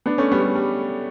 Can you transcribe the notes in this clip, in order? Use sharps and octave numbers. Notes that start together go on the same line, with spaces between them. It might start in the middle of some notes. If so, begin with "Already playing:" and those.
B3 D4
A3 C#4
G3 B3
G3
G3